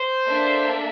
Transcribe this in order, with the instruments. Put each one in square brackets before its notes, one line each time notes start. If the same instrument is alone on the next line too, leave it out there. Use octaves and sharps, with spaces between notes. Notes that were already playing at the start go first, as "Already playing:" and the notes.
Already playing: [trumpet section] C5
[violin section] A#3 D4 A4 E5